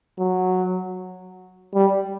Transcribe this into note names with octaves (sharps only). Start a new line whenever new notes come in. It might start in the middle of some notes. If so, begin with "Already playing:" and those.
F#3
G3